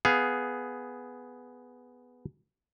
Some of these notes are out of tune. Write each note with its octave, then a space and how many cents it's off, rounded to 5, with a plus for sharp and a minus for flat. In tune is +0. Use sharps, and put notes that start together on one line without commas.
B3 +5 G#4 +5 F5 +5